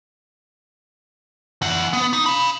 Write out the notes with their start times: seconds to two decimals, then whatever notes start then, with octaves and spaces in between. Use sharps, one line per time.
1.62 E3 F#5
1.93 B3
2.13 D#4
2.26 F5 B5